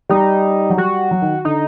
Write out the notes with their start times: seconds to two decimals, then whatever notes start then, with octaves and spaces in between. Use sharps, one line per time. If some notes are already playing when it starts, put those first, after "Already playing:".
0.09 G3 D#4
0.70 F#3
0.77 G3 F#4
1.11 F#3
1.22 D#3
1.45 D3 D#4